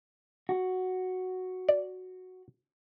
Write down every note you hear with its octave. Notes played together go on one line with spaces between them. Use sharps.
F#4
D5